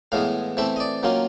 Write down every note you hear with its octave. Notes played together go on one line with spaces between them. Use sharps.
A2 E3 G#3 B3 F5
E3 A3 C4 E5
D#5
D5
D#3 F#3 A#3 C#4 F4